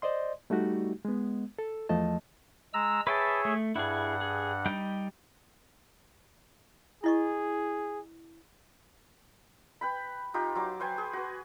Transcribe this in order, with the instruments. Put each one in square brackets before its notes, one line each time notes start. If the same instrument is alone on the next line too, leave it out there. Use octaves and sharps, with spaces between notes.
[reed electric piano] C5 D5 D#5 C6
G3 A3 D#4 F#4 G4
G#3 B3
A4
E2 F3 A3 D#5 A5
[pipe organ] G#3 A#5 E6
[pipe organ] G#4 C#5 E5 [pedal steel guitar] B4 G5 A5
[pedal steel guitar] A3
[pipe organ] G2 F#5 [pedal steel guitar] E4 G#4
[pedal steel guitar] G#4
G3 D#4 G5
[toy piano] E4 D#5 C#6 [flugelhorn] G#4
[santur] B4 G5 B5
D#4 F4 G4
F#3 C6 D6
B4 C5 G5 G#5
G#4
F#4 B4